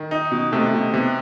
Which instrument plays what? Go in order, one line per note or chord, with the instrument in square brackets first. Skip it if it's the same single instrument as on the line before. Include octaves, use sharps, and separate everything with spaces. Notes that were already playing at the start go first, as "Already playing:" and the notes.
Already playing: [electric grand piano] D#3
[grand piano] D#4
B2
[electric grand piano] C3 [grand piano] A3
[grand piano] B2
[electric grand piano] C3 [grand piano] B3